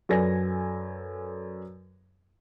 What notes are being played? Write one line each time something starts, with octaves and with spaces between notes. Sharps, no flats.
F#2 A4 B4 D5 G#5 A#6